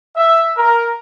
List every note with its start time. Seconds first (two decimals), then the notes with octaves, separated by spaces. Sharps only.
0.16 E5
0.57 A#4